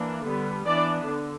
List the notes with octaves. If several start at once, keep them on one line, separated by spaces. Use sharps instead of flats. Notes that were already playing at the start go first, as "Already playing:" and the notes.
Already playing: E3 A#3 D4
D3 G3 B3
E3 B3 D4 D5
D3